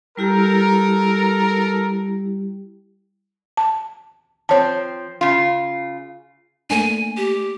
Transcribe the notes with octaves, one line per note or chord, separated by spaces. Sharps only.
G3 E4 G4 A4 A#4
A5
F3 C4 C#5 A5
C#3 F4
A3 A#3 D4 G#5
G4